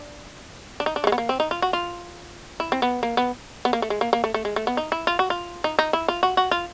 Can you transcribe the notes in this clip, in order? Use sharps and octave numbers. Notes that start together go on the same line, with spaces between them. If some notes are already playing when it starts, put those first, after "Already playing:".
Already playing: D4
D4
D#4
D4
A3
G#3
B3
A#3
C4
D#4
F4
F#4
F4
E4
C4
B3
A#3
B3
B3
A#3
A3
G#3
A#3
A#3
A3
A3
G#3
A3
B3
D#4
E4
F4
F#4
F4
D#4
D#4
E4
F4
F#4
F#4
F4